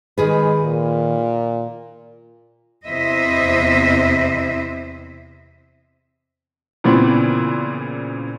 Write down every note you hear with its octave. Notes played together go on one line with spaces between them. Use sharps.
D#3 G#3 G#4 B4
A#2
E2 C3 E4 C5 D#5 E5
A#2 C#3 E3 B3 C4